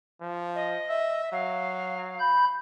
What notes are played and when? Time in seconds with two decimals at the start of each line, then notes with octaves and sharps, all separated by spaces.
0.22 F3
0.55 D#5
0.89 E5
1.32 F#3 F5
2.20 B5 G6